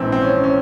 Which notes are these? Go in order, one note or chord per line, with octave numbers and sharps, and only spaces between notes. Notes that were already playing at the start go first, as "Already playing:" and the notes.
Already playing: A#1 G#2 E3 C4
C4
C#4
C#4